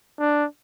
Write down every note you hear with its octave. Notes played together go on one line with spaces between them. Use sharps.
D4